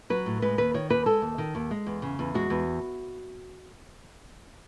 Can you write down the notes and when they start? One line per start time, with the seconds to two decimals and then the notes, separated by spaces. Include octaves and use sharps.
0.10 F#3 B4
0.26 A2
0.42 G#3 B4
0.58 D#2 B4
0.74 D#3 C#5
0.90 D#2 B4
1.06 G#3 A4
1.22 D#2
1.38 D#3
1.55 D#2
1.71 G#3
1.87 E2
2.02 C#3
2.19 E2
2.35 G#3 F#4
2.50 E2